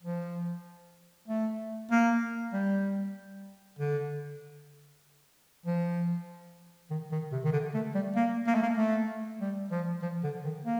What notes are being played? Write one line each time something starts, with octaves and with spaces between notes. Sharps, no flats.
F3
A3
A#3
G3
D3
F3
D#3
D#3
C3
D#3
D3
A3
G3
A#3
A#3
A3
A#3
A3
G3
F3
F3
D3
D#3
A#3